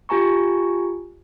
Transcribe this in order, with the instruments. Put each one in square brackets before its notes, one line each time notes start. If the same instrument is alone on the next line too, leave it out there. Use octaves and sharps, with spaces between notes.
[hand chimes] F4 G4 G#5 A#5 C#6